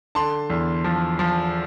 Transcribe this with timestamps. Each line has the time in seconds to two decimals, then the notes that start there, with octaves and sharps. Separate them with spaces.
0.15 D3 A5 C6
0.50 E2
0.84 F3
1.19 F3